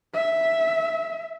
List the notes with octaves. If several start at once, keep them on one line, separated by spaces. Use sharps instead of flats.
E5